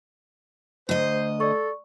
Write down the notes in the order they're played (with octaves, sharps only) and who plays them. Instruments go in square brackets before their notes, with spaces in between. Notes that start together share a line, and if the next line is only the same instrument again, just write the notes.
[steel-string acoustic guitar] D2 D#5 [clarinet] C5
[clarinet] A4 [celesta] D5 C#6